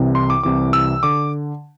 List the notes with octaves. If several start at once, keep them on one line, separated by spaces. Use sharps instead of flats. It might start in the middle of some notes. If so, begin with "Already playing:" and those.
Already playing: C2 C3 E3
C6
D6
C2 C3 E3 D6
E6
D3 D6